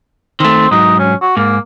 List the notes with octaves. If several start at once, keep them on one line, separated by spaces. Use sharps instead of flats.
D#3 A3 C4
G#2 F#3 D#4
C#4
F#4
G#2 A#3